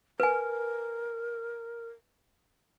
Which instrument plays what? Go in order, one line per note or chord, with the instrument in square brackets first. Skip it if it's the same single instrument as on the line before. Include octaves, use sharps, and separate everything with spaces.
[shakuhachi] A#4 [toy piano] B4 G#5